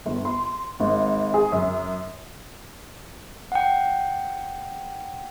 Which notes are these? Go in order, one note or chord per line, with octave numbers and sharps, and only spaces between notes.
G1
C6
G#1
G#4
F#2
F#5 G5